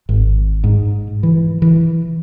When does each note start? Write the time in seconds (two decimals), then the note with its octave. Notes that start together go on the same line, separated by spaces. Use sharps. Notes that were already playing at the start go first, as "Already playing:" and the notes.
0.09 G#1
0.64 G#2
1.23 E3
1.62 E3